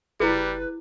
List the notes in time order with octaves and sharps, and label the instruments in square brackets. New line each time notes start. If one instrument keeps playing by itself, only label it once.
[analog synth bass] F#1 [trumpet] G3 [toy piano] E4 G#4 [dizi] B4